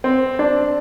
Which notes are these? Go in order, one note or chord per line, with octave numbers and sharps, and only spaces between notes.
C4
D4